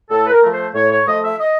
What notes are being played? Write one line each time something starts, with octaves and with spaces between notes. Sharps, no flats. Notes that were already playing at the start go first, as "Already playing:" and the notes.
A2 A4
B4
A#4
F3 A3
C5
A2 C#5
C#5
F3 A3 D#5
E5
D#5